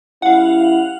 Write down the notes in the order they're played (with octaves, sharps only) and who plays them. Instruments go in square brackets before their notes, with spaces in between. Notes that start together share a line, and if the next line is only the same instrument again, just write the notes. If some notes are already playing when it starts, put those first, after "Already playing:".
[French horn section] G3 C#4 E4 [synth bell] F5 F#5